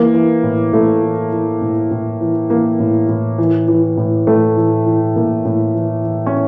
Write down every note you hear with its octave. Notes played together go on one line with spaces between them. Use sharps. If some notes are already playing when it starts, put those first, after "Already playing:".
Already playing: E3 A#3
E3
A2
A2 A3
E3
E3
A2
A2
E3
E3 A#3
A2
A2
E3
E3
A2
A2 A3
E3
E3
A2 A#3
A2
E3
E3
C#4